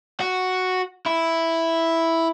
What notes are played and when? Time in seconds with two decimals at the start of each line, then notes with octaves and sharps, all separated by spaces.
0.20 F#4
1.06 E4